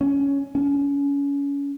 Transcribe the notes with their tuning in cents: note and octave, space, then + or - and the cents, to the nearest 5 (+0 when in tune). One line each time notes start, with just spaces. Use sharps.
C#4 +10
C#4 +30